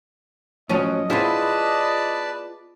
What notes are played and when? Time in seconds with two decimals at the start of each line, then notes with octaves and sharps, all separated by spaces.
0.70 A2 F3 F#3 C#4 D#5
1.10 B3 E4 F4 G#4 B4 C5 D5 A5